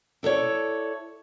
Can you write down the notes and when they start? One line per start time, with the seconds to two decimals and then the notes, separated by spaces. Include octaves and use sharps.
0.23 E4 A4 A#4 C#5 D5